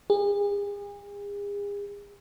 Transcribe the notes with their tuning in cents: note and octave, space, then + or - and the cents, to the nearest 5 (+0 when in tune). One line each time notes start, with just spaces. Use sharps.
G#4 -40